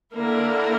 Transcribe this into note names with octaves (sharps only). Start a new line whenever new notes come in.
D3 A#3 E4 A#4